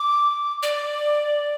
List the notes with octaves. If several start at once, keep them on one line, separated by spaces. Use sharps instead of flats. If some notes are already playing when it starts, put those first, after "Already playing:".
Already playing: D6
D5